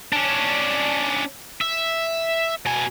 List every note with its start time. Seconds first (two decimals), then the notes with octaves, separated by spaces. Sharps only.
0.12 C#4 D4
1.61 E5
2.66 B2 G#5